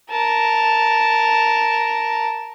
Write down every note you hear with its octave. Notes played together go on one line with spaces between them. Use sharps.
A#4 A5